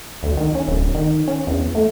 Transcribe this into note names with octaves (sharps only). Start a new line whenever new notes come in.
D2
D#3
C#4
D1
D#3
C#4
E2
A3